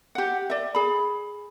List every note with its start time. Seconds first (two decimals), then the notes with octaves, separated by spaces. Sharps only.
0.15 G4 F#5
0.50 D5 E5
0.75 G#4 B5